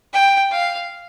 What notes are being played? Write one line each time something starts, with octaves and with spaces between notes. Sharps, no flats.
G5
F5